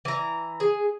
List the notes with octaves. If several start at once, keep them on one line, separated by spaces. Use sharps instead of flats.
E3 A#5
G#4